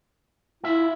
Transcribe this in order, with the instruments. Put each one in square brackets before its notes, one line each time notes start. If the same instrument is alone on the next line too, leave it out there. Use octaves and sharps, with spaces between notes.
[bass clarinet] E4 [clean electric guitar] F4 E5